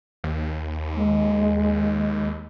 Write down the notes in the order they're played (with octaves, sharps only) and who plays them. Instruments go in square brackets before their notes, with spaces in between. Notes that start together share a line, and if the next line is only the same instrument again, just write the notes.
[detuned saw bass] D#2
[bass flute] G#3